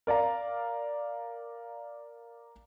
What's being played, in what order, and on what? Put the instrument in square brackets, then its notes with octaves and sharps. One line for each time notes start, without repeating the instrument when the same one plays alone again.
[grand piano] A#4 D5 F5 A#5